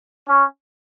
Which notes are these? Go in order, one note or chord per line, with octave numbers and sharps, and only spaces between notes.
C#4